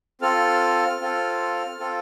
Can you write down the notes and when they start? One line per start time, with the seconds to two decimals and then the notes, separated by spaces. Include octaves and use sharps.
0.22 C4 F4 A4 F6
1.00 C4 F4 A4
1.79 C4 F4 A4